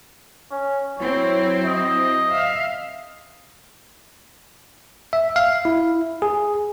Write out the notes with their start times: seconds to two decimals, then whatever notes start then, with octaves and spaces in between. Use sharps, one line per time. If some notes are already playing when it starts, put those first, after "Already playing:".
0.51 C#4
0.99 F#3 C4 E4 C#5
1.66 D#5
2.31 E5 F5
5.13 E5
5.36 F5
5.65 E4
6.22 G#4